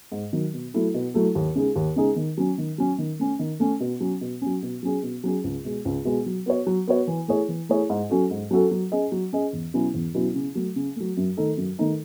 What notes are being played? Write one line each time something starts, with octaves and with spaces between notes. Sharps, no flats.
G#2
D#3 F#3
B2
F#3 A3 E4 A4
B2
F#3 A3 E4 A4
D#2
C#3 G#3 D#4 G#4
D#2
C#3 G#3 D#4 G#4
D#3
F#3 C#4
D#3
F#3 C#4
D#3
A3 C#4
D#3
A3 C#4
B2
F#3 C#4
B2
F#3 C#4
B2
F#3 C#4 G#4
B2
F#3 C#4 G#4
C#2
B2 G#3
C#2
B2 G#3
F#3
B3 F#4 C#5
F#3
B3 F#4 C#5
E3
A3 E4 G#4 C#5
E3
A3 E4 G#4 C#5
G#2
F#3 C#4 F#4 A4
G#2
F#3 C#4 F#4 A4
F#3
C#4 G#4 D#5
F#3
C#4 G#4 D#5
E2
B2 F#3 C#4 E4
E2
B2 F#3 C#4 E4
C#3
F#3 A3
C#3
F#3 A3
F#2
D#3 A3 D#4 A4
F#2
D#3 A3 D#4 A4